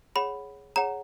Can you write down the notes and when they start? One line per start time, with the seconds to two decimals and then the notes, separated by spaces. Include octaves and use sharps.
0.15 G#4 C#5 F#5 B5
0.76 G#4 C#5 F#5 A#5